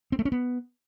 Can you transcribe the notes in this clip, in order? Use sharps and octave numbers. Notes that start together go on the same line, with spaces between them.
C4
A3
C#4
B3